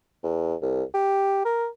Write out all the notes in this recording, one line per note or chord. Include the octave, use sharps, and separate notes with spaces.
E2
C2
G4
A#4